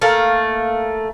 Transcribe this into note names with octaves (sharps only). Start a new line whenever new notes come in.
A3 A#3 F5